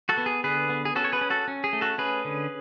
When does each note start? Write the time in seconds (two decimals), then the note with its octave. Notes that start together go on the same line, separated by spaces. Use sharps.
0.09 F#4 A4
0.17 B3
0.26 G#4
0.44 D3 G#4 B4
0.69 B3
0.85 G#4
0.96 C#4 F#4 A4
1.05 C#5
1.12 G#4 B4
1.21 C#4
1.30 F#4 A4
1.48 C#4
1.64 G#4
1.73 A3
1.81 F#4 A4
1.98 C#4 G#4 B4
2.25 D3